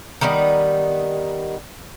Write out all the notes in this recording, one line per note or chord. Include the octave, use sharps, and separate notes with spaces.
D#3 G3 B3 D#4